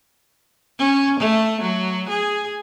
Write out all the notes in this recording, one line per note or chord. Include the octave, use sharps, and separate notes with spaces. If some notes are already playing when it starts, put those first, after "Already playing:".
C#4
A3
F#3
G#4